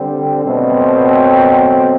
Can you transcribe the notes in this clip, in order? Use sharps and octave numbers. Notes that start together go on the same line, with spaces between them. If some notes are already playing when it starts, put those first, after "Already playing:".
Already playing: D3 G3 C4
B2 F#3 A3 C4